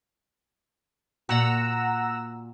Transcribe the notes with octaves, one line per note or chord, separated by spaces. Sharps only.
A#2 F#4 F#5 A#5 E6